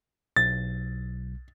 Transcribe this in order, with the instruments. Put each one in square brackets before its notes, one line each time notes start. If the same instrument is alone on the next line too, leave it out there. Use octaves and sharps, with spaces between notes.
[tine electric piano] B1 [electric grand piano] A6